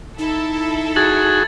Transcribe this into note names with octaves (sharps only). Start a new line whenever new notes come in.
D#4 E4 A4
F#4 G#4 G#6 A6 F#7